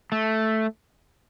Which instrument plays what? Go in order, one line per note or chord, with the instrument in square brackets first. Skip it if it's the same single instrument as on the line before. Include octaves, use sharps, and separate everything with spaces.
[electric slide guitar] A3